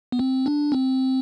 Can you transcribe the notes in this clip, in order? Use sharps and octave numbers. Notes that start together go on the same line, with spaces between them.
B3
C4
D4
C4